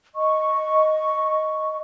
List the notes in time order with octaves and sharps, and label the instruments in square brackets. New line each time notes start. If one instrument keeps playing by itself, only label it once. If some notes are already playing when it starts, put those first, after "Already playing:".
[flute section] D#5 C#6